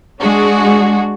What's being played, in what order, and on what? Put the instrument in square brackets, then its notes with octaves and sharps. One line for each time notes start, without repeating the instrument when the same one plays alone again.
[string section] G#3 D4 F#4 G#4